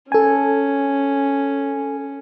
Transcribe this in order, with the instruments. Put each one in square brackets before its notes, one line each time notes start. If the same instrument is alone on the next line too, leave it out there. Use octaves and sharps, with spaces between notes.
[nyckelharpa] C#4 [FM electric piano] A4 G#5